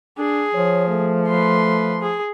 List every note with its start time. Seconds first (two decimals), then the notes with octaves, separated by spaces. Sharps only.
0.19 D4 G#4
0.54 F3 C#5
0.88 A3
1.28 B4 C6
2.01 G#4